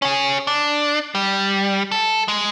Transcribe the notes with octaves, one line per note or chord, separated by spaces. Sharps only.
C#4 G#4
D4
G3
A4
G#3